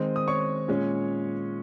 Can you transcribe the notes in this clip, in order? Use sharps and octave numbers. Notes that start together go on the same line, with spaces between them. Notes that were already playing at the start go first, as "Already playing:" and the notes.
Already playing: D#3 G#3 C4 D#5
D#6
C#5 C#6
A#2 G#3 C#4